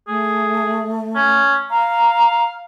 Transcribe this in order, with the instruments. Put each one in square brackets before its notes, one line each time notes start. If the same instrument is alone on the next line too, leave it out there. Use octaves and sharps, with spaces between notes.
[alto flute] A3 [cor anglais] G#4
[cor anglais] C#4
[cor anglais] F5 [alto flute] A#5